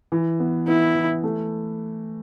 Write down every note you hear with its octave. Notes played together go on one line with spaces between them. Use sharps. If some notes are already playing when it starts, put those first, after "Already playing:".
E3
B3
B3 E4
E3
A3